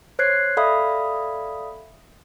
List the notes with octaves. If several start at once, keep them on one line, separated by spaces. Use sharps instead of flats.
C5 C#5 F#6 G#6 C7
A4 D5 E5 F5 B5 D#6